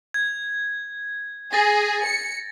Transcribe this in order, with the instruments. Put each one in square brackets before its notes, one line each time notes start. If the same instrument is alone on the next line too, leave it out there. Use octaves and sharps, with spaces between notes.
[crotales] G#6
[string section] G#4 [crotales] A6 A#6
[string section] C#7